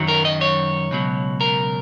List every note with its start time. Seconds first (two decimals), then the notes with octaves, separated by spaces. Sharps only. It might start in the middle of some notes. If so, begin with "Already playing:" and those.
Already playing: F#2 D#3 F#3
0.08 A#4
0.25 D#5
0.41 C#5
0.91 C#2 B2 F#3
1.41 A#4